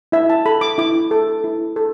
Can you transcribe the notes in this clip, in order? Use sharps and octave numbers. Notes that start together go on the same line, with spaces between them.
E4 E5
A5
A4 B5
D6
E4 D6
A4
E4
A4